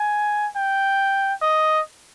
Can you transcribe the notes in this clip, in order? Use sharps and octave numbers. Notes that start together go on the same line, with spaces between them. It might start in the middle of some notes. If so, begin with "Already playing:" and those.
Already playing: G#5
G5
D#5